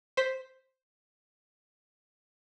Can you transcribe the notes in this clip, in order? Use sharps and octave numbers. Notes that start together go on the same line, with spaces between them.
C5 B6